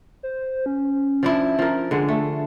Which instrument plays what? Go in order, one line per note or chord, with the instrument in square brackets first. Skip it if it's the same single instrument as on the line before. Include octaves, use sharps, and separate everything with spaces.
[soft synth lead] C5
C#4
[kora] F3 D4 E4
F3 A#4
[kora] D3 G#3 [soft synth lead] D4
[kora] A3